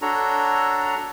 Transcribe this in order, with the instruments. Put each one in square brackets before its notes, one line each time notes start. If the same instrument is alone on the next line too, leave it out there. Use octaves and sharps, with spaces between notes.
[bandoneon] D4 F#4 A4 C#5 A#5